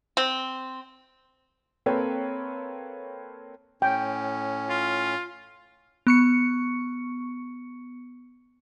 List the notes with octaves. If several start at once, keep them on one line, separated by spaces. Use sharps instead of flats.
C4
A#3 C4 A4 B4 C#5 G5
A2 C#4 G5
F4
B3 C#6 C#7